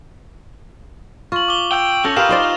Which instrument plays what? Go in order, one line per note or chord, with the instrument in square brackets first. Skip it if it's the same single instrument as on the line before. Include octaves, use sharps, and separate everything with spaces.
[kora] F4 [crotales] C#6 F#7
[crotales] D6 G7
[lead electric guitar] G5 [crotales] E6 G6 F7
[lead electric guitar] C#4 [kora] A4 [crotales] F6 G6 A#6
[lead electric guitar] F4 F5 [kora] G4 A#4 B4 [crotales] D#6 F6 E7
[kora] D#4 C5 D5